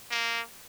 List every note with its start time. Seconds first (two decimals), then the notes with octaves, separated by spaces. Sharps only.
0.11 A#3